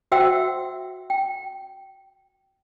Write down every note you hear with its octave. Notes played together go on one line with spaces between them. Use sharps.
F#4 C5 E5 F#5 G5 E6
G5